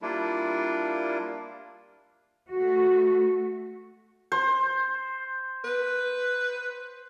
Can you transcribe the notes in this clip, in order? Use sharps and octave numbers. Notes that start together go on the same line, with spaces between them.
G3 A#3 D4 E4 F4
A3 F#4
C5
B4